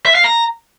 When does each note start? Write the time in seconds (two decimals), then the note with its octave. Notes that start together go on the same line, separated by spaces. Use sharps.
0.06 E5
0.15 F5
0.24 A#5